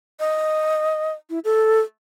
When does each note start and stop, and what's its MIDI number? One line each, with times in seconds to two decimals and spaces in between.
0.20 1.13 75
1.30 1.39 64
1.44 1.80 69